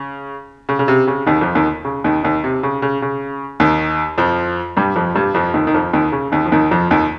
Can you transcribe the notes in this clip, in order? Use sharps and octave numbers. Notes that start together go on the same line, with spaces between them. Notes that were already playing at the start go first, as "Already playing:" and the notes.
Already playing: C#3
C#3
C#3
C3
C#3
D#2 D#3
F2 F3
D#2 D#3
C#3
D#2 D#3
D#2 D#3
C3
C#3
C#3
C#3
D#2 D#3
F2 F3
G2 G3
F2 F3
G2 G3
F2 F3
D#2 D#3
D#3
F2 F3
D#2 D#3
C#3
D#2 D#3
F3
D#2 D#3
F2 F3
D#2 D#3